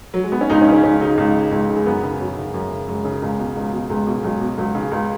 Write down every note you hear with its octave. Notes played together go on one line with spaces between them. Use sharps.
F#3
G#3
B3
C#4
C#2 D#4
C#4
C#3
C#4
C#2 C#4
C#3 D#4
C#2
C#3
C#2
C#3
G#3
F#2 B3
C#3
F#2 F#3
C#3
F#2
C#3
F#2 G#3
C#3
C#2
B2
C#2
B2
C#2 G#3
B2 G#3
C#2 F#3
B2
C#2 F#3
C#3
C#2